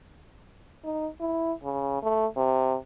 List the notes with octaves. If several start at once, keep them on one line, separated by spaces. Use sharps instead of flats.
D#4
E4
C#3
A3
C3